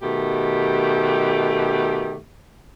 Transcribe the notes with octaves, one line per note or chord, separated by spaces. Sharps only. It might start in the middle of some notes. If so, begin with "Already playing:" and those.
B2 D#3 A3 G4